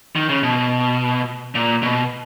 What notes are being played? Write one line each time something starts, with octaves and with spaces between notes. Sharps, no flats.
D#3
C#3
B2
A#2
B2